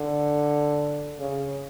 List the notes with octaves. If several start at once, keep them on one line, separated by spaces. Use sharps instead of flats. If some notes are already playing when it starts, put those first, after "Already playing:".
Already playing: D3
C#3